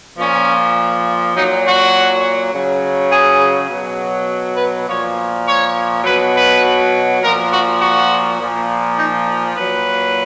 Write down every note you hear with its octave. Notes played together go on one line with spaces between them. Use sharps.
A#2 F3 C#4
A#2 F#3 D#4
F#4
C#3 F#3
G#4
B2 F#3
B4
A#2 F3 C#5
C#5
B2 F#3 B4
B4
A#2 F3 A#4
F#4
F#4
A#2 F3
D#4
A#2 F#3 B4